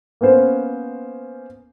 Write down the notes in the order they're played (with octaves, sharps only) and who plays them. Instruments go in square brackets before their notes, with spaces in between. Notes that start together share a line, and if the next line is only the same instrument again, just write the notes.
[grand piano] A#3 B3 C#4 C5